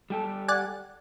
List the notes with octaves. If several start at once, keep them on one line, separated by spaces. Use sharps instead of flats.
G3 G4 A4
D5 F#5 G#5